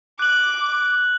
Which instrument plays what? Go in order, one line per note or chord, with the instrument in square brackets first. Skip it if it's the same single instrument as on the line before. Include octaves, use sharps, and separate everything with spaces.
[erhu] D6 [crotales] F#6 F#7